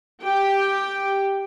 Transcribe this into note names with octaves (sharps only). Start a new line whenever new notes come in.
G4 G5